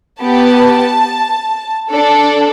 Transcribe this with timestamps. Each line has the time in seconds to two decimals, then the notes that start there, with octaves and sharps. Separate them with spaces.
0.20 B3 G4 A5
1.90 D4 A4